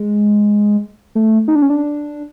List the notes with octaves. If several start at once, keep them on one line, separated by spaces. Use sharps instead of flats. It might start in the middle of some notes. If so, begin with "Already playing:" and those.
Already playing: G#3
A3
D#4
D4
C#4
D4